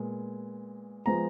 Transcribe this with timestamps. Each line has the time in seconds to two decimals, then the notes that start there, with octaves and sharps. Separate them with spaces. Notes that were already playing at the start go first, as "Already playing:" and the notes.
Already playing: A#2 G#3 B3
1.06 F3 G#3 B3 A#5